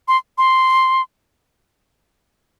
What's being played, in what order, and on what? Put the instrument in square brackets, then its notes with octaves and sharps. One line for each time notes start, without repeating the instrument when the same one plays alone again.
[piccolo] C6
C6